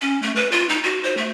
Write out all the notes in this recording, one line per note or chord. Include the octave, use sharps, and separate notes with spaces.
C#4
A3
B4
F4
D#4
F#4
C5
A3